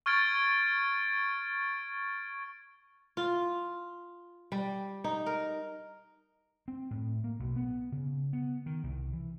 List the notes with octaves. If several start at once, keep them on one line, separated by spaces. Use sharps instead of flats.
C#6 F6 G#6 A6 D7
F4
G3
D#4
A#4
C4
A2
A#3
B1
B3
C#3
B3
D#3
C2
E3